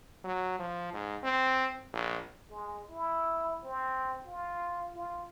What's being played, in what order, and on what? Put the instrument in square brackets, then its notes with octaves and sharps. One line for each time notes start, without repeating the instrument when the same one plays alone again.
[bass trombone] F#3
F3
G#2
C4
A#1
[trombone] G#3
E4
C4
F4
F4